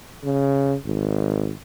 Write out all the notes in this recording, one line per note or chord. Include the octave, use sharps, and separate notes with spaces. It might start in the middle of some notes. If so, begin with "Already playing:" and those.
C#3
G#1